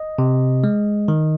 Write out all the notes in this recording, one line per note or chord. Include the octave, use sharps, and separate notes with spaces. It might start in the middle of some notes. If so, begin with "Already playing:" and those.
Already playing: D#5
C3
G#3
D#3